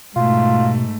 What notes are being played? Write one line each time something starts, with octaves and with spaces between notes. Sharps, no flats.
G#2 B2 A3 F4